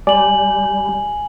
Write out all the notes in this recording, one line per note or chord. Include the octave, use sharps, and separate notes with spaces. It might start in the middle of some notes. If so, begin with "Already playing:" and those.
G3 D5 G#5 F#7